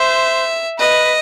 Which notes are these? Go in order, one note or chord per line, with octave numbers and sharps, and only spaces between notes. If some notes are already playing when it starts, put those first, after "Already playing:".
Already playing: C5 E5
B4 D#5